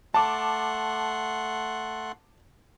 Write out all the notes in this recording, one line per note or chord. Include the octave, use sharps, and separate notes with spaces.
A3 F#5 A5 C6 D6